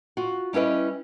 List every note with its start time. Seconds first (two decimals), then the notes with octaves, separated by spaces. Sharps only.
0.17 F4 F#4
0.53 G3 C#4 E4 B4 D#5